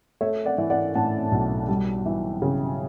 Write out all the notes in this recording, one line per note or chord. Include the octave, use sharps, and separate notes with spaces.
A3 C#5 E5
D5 F#5
E3
D5 F#5
A2 F#5 A5
B1
G3
E3
C#3